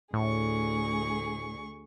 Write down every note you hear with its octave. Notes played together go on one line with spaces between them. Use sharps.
D2 A2 G#4 C#6